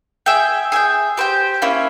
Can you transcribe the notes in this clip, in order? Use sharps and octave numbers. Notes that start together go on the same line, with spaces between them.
G#4 E5 G5
G#4 E5 G5
G4 C5 G5
A#3 C#4 E4